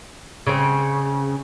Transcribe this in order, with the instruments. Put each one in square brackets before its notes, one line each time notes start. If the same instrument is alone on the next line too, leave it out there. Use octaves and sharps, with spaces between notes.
[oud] C#3 C4